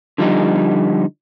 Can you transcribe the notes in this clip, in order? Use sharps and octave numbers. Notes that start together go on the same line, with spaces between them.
D3 F3 G3 D#4